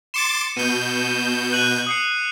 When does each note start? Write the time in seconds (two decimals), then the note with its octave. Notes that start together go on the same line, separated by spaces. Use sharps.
0.14 C6 D6 A6 C#7 E7
0.56 B2 G6 D#7
1.53 F#6 D#7 F#7
1.87 D#6 C7 C#7